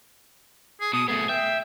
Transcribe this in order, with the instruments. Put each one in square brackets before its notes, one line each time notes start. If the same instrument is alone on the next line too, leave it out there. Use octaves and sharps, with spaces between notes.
[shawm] G#4
[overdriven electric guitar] B2 [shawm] D#6
[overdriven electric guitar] A3 B3 [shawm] G#4
[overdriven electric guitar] E5 [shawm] G5